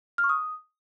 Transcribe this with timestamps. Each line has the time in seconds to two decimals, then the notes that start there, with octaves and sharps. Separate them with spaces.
0.18 F6
0.24 C#6
0.29 D#6